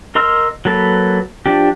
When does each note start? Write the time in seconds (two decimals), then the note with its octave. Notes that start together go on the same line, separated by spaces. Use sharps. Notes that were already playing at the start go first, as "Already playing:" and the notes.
0.15 A#4 D#5 C6 E6 F6
0.65 F#3 A#3 A4 B4
1.46 F3 D4 G4